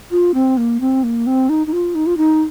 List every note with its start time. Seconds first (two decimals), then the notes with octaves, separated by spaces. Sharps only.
0.11 F4
0.34 C4
0.57 A#3
0.81 C4
1.04 A#3
1.27 C4
1.49 D#4
1.67 D#4
1.73 F4
1.95 D#4
2.06 F4
2.17 D#4